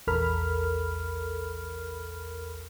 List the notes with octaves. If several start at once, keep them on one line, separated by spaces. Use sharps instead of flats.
A#1 E2 A4 A#4 B5 F6